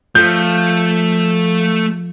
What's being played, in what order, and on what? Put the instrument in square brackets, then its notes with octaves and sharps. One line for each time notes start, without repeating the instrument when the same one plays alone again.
[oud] F3 [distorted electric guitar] A3 [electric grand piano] G6